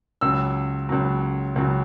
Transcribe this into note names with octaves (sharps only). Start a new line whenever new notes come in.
C#2 C#3 F#3 E6
C#2 C#3 F#3
C#2 C#3 F#3